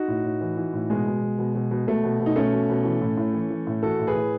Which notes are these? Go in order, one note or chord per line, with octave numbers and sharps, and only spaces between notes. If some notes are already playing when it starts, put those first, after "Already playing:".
Already playing: D#4 F#4
A2
A2
E3
E3
A2
B2 G#3
B2
B2
B2
B2
B2
B2 A3
B2
B2
D#4
B2 A3 C#4
B2
B2
E3
A2
A2
E3
E3
A2
E3 F#4 A4
A2
G#4 B4
A2